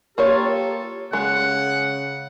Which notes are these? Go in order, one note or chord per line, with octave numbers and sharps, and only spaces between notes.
A#3 F4 G4 A4 C#5
C#3 G#3 F#5